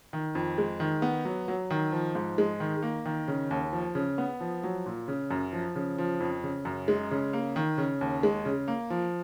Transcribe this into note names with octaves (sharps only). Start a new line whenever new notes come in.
D#3
F2
G#3
D#3
B3
F#3
F#3
D#3
F3
G#2
G#3
D#3
A#3
D#3
C#3
D#2
F3
C#3
B3
F3
F#3
A#2
C#3
F#2
F3
C#3
F3
F2
C#3
F#2
G#3
C#3
A#3
D#3
C#3
D#2
G#3
C#3
A#3
F3